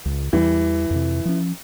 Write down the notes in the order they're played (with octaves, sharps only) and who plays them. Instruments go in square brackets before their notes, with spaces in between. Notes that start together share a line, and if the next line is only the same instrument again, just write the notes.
[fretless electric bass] C#2
[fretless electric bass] E2 G3 [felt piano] E3
[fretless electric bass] F2 C3
F3 C#4